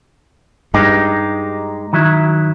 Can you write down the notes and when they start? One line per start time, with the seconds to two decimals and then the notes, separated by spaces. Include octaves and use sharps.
0.74 G2 G#3 D#4 G4
1.93 D#3 F#3 E4